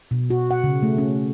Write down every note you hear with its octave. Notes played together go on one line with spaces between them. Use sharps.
B2
F#4
F#5
C#3
A3
C#4